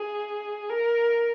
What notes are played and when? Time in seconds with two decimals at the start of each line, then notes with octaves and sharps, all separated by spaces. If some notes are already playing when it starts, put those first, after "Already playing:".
Already playing: G#4
0.69 A#4